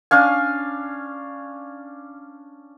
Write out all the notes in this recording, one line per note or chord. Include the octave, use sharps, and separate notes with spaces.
C#4 D4 F5 G#5